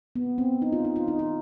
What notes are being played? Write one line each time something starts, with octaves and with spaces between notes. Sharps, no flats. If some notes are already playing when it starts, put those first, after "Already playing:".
B3
C4
D#4
F4
D#4
F4
D#4
F4